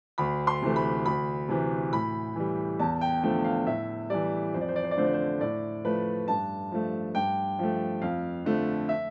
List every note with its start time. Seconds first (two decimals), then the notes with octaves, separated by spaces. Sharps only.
0.18 D2 B5
0.47 C6
0.62 C3 E3 A3
0.76 B5
1.05 D2 B5
1.48 C3 E3
1.92 A2 B5
2.36 E3 G3
2.79 E2 A5
3.01 G5
3.23 D3 F3 A3 G5
3.45 F5
3.67 A2 E5
4.10 E3 G3 D5
4.54 F2 C5
4.61 D5
4.68 C5
4.76 D5
4.84 C5
4.91 D5
4.97 D3 F3 A3 C5
5.06 D5
5.13 C5
5.40 A2 D5
5.84 F3 A3 B4
6.28 G2 A5
6.72 F3 A3
7.15 G2 G5
7.59 F3 A3
8.02 F2 F5
8.45 D3 F3 A3
8.89 E5